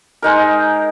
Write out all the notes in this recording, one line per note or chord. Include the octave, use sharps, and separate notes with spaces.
G#3 D#4 A#4